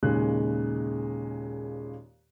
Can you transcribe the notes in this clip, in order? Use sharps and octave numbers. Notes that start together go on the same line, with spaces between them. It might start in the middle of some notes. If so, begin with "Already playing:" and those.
D#2 A#2 C#3 G#3 F#6